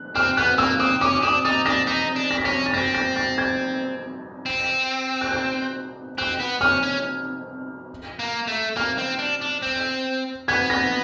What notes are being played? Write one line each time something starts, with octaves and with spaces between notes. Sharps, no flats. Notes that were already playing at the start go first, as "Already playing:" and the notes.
Already playing: F#6
C4 F6
B3 F#6
A#3 E6
C4 D#6
C#4 D6
D4 D#6
D#4 A6
D4 A#6
D#4 B6
D4
A#6
B6
C#4 A#6
A6
C4 A#6
A#6
A6
G#6
C4
F#6
G6
C4 F#6
B3
C#4 F6
C#4
A#3
A3
A#3 F6
C4
D4
D4
C4
B3 G#6
A#6